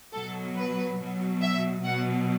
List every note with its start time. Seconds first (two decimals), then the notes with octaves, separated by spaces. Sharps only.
0.13 B2 F#3 A4
0.56 B4
0.99 B2 F#3
1.41 E5
1.83 B2 F#3 F#5